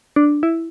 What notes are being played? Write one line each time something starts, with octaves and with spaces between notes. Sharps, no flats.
D4
E4